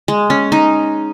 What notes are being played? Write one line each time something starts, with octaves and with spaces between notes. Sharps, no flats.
G#3
C#4
D#4